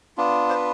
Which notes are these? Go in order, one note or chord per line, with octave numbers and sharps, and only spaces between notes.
B3 D4 F4
C5
B4